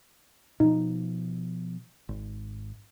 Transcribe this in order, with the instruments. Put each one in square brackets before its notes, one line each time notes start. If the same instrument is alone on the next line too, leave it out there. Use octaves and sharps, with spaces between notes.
[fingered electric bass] B2 F3 [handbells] D#4
[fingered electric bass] G#1